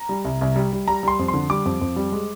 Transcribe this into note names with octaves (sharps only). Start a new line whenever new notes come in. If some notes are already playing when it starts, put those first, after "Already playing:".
Already playing: A#5
G3
C2
C2
G3
G3
G3 A#5
G3 C6
F2
C6
D3
G3 D6
F2
F2
G3
G#3